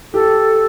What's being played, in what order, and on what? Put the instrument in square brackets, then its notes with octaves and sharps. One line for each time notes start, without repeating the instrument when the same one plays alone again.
[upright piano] G4 [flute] A4